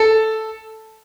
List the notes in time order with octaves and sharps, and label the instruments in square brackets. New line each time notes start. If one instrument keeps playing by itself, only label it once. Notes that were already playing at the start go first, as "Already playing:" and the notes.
Already playing: [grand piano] A4 A5